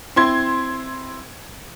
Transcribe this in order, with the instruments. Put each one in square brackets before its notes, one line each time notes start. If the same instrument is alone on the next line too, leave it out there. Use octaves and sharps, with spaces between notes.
[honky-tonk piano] C4 E4 C6 G#6